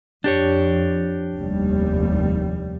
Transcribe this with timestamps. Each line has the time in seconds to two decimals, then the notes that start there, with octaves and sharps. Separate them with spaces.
0.24 F2 D4 G4 C#5
1.38 F1 D#2 G3